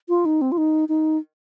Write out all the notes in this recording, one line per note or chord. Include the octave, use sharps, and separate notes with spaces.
F4
D#4
C4
F4
D#4
D#4